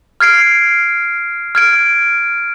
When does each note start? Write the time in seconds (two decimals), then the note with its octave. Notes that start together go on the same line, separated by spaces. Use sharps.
0.20 F6 G#6 C7 D7
1.55 F6 G#6 D7